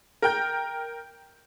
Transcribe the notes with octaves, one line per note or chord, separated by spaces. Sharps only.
A#4 G5 G6